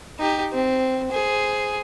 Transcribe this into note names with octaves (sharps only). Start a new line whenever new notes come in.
D#4 G4
C4
G#4 C5